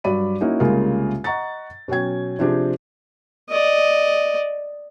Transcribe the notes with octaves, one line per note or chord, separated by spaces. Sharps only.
G2 F#3 D5 B5 D#7
A#3 C#4 D#4 E4 F#4
C2 C#3 G#3 A#3 F4 A#4
D#5 F#5 A#5 C#6 A6
B2 F#3 C#4 G5 G#6
C3 F3 C4 D4 G4 G#4
D5 D#5